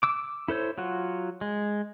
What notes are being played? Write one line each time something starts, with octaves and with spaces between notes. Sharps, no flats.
D6 E6
E4 A4 C5 C#5
F#3 F4 F#4
G#3